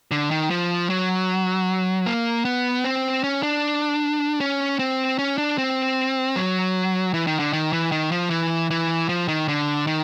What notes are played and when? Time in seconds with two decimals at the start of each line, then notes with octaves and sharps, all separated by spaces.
0.11 D3
0.31 D#3
0.50 F3
0.90 F#3
2.06 A#3
2.45 B3
2.84 C4
3.24 C#4
3.43 D4
4.41 C#4
4.79 C4
5.19 C#4
5.38 D4
5.58 C4
6.36 F#3
7.14 E3
7.27 D#3
7.39 D3
7.53 D#3
7.73 E3
7.92 D#3
8.12 F3
8.30 E3
8.71 E3
9.09 F3
9.28 D#3
9.48 D3
9.87 D#3